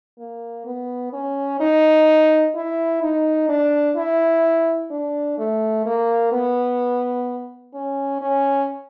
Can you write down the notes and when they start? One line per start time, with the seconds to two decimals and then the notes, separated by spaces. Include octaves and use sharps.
0.19 A#3
0.66 B3
1.13 C#4
1.60 D#4
2.55 E4
3.02 D#4
3.49 D4
3.96 E4
4.91 D4
5.38 A3
5.85 A#3
6.32 B3
7.74 C#4
8.21 C#4